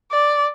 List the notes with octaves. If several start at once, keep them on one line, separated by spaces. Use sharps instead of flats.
D5